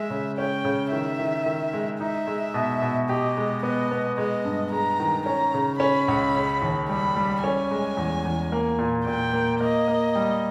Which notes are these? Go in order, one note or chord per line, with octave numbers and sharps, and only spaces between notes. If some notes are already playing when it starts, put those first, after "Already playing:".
Already playing: G#3 E5
C#3
C#4 G5
C#3
D#3 E5
D#3
D#3
G#3
D#4 E5
G#3
B2
B2
G4 D#5
G#3
B3 D#5
B3
G#3 D#5
G2
G#3 A#5
D#3
C#4 A#5
C#3
C#4 B5
C#2
C#3
D#2
G3 B5
G3
C#4 G#5
G#3
E2
E2
A#3
A#2
A#2 G5
A#3
A#3 D#5
A#3
G3